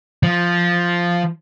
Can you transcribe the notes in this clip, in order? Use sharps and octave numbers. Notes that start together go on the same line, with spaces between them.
F3